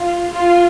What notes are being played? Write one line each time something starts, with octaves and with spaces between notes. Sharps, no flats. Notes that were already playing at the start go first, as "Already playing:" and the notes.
Already playing: F4
F4